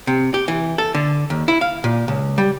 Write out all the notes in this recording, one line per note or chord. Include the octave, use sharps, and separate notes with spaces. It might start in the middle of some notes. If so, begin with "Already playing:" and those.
C3
G4
E3
A4
D3
D#2
E4
F5
A#2
C#2
G3